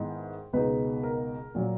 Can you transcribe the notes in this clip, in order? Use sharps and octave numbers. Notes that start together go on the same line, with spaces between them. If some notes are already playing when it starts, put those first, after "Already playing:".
Already playing: G#2 D#3 G#3 B3 E4
C#2 B2 G#3 D#4 B4
A#4
A#2 F#3 A#3